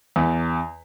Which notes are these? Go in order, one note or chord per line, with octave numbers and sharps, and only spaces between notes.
E2